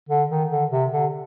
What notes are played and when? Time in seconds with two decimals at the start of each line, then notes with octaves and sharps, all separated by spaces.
0.09 D3
0.30 D#3
0.50 D3
0.71 C3
0.92 D3